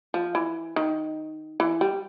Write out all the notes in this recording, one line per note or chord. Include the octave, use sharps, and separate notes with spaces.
F3
E3
D#3
E3
G3